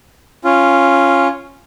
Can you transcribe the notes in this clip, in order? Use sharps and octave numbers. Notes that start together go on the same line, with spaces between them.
C#4 F4